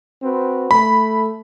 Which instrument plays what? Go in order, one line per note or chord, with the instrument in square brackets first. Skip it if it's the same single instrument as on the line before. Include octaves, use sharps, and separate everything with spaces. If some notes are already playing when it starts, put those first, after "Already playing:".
[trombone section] C4 F#4 B4
[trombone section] A3 [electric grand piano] B5